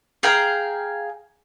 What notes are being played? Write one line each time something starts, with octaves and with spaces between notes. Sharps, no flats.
G#4 F5 G5 A#5